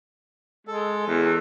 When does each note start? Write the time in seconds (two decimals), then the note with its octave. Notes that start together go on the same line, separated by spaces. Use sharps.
0.67 G#3 A4
1.07 E2